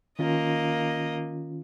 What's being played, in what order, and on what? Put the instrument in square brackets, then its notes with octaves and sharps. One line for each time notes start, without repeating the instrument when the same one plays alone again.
[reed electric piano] D#3 C#4 F4 [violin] A#3 D#5